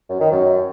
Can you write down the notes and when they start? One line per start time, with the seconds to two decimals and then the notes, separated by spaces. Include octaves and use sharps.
0.10 F#2
0.21 D#3
0.31 F#2